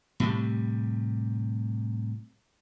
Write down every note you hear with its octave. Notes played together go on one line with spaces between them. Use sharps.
A2 C3 G3